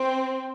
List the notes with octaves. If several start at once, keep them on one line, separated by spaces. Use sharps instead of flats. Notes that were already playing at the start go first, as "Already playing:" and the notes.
Already playing: C4